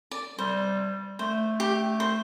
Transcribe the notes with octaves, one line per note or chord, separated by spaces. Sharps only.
D5
G3 C5
A3 C5
G4
C5